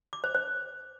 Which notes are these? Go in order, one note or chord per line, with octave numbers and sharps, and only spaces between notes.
D6
C5
C5